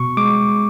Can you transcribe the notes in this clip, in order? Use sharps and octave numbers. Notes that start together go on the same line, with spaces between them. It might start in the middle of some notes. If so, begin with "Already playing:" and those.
Already playing: B2 C#6
G#3 D6